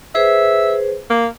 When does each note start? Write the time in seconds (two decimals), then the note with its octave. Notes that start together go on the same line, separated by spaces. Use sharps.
0.15 G#4 B4 C5 E5
1.10 A#3